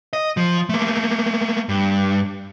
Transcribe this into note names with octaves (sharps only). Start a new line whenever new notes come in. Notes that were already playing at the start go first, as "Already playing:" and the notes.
D#5
F3
A3 A#3
G2